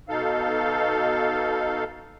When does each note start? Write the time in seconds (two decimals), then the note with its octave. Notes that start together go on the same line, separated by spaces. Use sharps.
0.09 B2 D#4 A4 F5